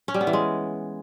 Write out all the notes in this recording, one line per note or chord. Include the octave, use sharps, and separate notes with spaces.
C#4
G3
B3
E3
G#3